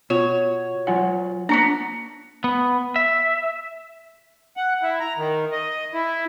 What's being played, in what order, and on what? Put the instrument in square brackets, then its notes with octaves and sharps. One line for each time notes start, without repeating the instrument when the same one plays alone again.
[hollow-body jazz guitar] B2 [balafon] F4 [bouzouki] C#5
[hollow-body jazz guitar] F#3 F4 F#5 [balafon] G#5
[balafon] A#3 [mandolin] B3 C#4 A#5 [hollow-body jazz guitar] D4
[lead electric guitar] B3
E5
[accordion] F#5
E4
A#5
D#3
D#5
E4